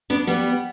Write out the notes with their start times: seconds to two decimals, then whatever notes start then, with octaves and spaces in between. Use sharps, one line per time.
0.10 B3 D4
0.27 G3 B3